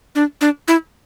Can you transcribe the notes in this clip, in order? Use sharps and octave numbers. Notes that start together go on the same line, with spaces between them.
D4
D4
E4